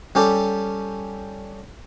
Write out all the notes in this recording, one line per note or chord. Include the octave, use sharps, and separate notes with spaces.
G3 C#4 G4 A4